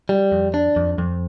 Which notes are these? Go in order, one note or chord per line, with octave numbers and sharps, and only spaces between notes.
G3
F2
D4
F2
F2